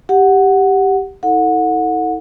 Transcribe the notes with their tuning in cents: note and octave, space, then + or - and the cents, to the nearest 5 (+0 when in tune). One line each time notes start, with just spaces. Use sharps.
G4 +0 F#5 +0
E4 -45 A4 +20 F#5 -25